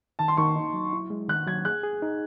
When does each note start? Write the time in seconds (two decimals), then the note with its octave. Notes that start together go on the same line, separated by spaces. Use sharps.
0.19 D#3 A5
0.28 C6
0.37 D#3 C#6
0.56 D#4
0.74 F#3
0.93 E4
1.10 G#3
1.29 D#3 F#6
1.47 F#3 G#6
1.65 G#4 F#6
1.83 G#4
2.02 D#4